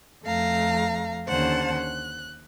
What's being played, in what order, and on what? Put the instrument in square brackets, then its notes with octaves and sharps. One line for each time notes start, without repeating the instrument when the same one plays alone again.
[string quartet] F2 A3 F5 A#5
D#2 D3 C#4 C5 F#5 A5
F#6